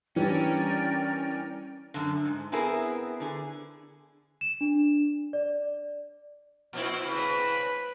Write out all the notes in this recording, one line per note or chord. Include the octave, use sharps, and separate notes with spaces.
E3 G3 C#4 D4 E4 A#4 D5 G5
F#2 D3
G#2
B3 C4 E4 G#4 A#4
D3 G#4
E7
D4
D5
A#2 C4 E4
C#3 C4 B4